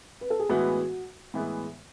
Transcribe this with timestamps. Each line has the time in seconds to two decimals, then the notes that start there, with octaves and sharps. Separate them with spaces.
0.21 B4
0.30 A4
0.39 G#4
0.49 A2 E3 G#3 B3 F#4
1.34 A2 E3 G#3 B3